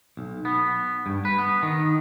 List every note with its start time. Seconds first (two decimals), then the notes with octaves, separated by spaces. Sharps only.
0.17 B1
0.45 B3
1.06 G2
1.25 B4
1.38 B3
1.63 D#3